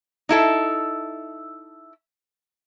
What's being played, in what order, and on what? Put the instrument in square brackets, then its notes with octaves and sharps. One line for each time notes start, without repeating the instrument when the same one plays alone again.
[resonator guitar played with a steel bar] D#4 E4 A4 E5